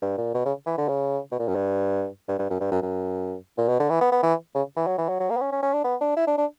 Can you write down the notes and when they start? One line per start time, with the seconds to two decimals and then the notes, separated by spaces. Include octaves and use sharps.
0.02 G2
0.18 A#2
0.34 B2
0.45 C#3
0.66 E3
0.77 D3
0.88 C#3
1.32 B2
1.39 A#2
1.48 F#2
1.55 G2
2.28 G2
2.39 G2
2.50 F#2
2.60 G2
2.71 F#2
2.82 F#2
3.58 A#2
3.68 B2
3.79 D3
3.90 E3
4.01 B3
4.11 B3
4.22 E3
4.55 C#3
4.76 E3
4.87 F#3
4.98 E3
5.08 F#3
5.19 F#3
5.30 A#3
5.37 B3
5.41 C#4
5.52 C#4
5.62 C#4
5.73 D4
5.84 B3
6.01 D4
6.16 E4
6.27 D4
6.38 D4